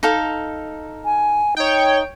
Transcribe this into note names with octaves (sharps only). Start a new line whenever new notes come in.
D#4 A4 F5
G#5
D#4 C#5 G5